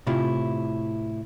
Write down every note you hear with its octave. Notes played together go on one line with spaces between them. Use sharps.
A2 C3 E4 F4 G4